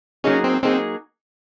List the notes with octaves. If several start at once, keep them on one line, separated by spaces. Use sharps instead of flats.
F#3 A#3 C#4 D#4 G#4
C4
F#3 A#3 C4 D#4 G#4